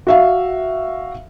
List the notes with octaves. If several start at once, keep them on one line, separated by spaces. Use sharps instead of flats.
F#4 E5 F5